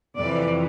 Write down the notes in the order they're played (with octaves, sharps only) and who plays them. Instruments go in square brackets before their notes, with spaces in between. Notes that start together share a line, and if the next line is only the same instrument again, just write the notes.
[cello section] F2 C3 E3 D5